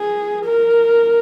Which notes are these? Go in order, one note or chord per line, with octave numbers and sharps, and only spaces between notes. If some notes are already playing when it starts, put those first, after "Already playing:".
Already playing: G#4
A#4